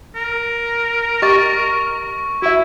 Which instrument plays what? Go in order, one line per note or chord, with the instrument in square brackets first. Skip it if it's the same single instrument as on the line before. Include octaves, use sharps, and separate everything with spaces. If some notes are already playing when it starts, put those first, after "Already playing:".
[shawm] A#4
[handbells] G4 D#5 A6 [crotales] C#6
[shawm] E4 [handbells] F#4 E5